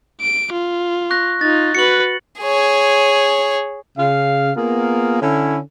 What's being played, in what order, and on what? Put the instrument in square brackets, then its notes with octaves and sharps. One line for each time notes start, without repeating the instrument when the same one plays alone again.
[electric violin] D7
F4
[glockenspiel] C#6 F#6 A#6
[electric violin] D#4 F4 [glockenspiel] A6
[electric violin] F#4 B4 [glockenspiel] C#7 F#7
[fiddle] G#4 C#5
[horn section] C#3 F5
A#3 B3 F4 G#4 A#4 F5
D3 C#4 E4